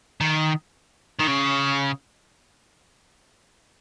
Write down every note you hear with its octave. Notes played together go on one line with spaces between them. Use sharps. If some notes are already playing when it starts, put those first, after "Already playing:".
D#3
D#3
C#3